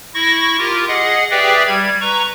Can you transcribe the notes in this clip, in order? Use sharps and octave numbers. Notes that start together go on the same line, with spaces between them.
E4 C#6 A#6
F4 G4 A#4
G#4 D#5 F#5
G4 G#4 B4 D5 E5 G5
G3 G#6
B4 A#5 C#6